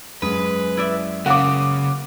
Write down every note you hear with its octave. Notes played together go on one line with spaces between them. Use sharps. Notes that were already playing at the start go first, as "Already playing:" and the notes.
F#2 G#3 B4 D#6
E4 D5 E5
C#3 A#3 F#4 F#5 D6